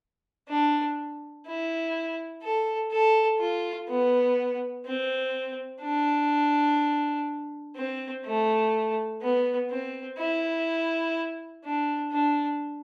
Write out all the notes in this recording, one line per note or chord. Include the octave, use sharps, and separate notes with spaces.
D4
E4
A4
A4
F4
B3
C4
D4
C4
A3
B3
C4
E4
D4
D4